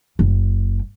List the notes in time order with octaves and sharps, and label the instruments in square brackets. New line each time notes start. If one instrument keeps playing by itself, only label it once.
[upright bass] F#1